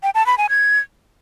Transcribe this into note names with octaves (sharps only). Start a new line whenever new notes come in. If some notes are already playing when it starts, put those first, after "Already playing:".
G5
A5
B5
G#5
G#6